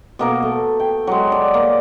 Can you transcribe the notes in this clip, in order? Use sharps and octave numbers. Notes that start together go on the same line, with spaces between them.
B2 A#3 A#4
A3
G5
F#3 G#3
D5
A#3